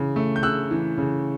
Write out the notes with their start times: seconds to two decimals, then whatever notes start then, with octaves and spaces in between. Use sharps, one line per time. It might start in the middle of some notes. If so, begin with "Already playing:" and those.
Already playing: C#3 E3
0.16 A3
0.36 G6
0.43 C#3 E6 F#6
0.71 E3
0.98 C#3